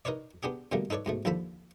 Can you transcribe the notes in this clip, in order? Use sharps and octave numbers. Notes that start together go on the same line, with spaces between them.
D#4 A#4 B4 C#5 D5
B3 D4 G4 G#4
B2 D3 G3 A3 A#3
D#4 A4 B4 C#5 D5
G#2 B2 A3
D#2 D3 F3 A4 A5 B5